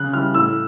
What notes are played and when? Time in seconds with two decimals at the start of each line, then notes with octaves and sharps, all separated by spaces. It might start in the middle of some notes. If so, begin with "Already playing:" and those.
Already playing: C#3 F#6
0.13 E3 G3 F6
0.34 A2 E6